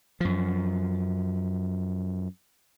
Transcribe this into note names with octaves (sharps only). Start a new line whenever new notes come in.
F#2 F3